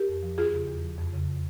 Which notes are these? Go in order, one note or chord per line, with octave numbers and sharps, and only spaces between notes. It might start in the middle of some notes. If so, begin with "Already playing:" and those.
Already playing: G4 A#4
F2
F3
E2 F4 G#4
C#3
E2
F3
F2
C#3